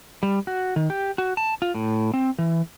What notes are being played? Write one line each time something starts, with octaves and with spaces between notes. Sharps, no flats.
G3
F#4
D#3
G4
F#4
A5
F4
A2
C4
E3